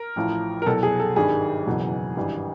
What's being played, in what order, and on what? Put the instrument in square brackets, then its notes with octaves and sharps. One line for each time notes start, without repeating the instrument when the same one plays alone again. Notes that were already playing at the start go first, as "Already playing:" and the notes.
Already playing: [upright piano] A#4
A1 A2 F3
A#4
C2 B2 F#3 A4
G#4
A4
G#1 G2 D#3 G3 G#4
F#1 E2 B2 F#3
G#1 G2 E3 G3